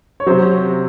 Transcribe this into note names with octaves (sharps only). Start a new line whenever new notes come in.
C#5
C3 F#3 C5